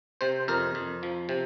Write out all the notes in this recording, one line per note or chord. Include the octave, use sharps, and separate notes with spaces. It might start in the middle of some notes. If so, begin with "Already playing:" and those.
C3 C5
F2 A#4
F2
F3
C3